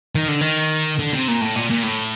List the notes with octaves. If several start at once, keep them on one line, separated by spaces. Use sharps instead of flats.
D#3
D3
D#3
D3
C3
A#2
A2
A#2
A#2
A2